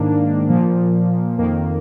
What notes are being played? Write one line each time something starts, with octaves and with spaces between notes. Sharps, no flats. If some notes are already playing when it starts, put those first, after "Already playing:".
Already playing: G#2 D#3 A#3 D4
A#2 F3 A#3
F2 D#3 A#3